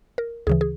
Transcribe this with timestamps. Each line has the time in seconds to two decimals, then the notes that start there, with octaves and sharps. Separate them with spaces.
0.18 A#4
0.47 D2 C#3 E3 G#4
0.61 G#4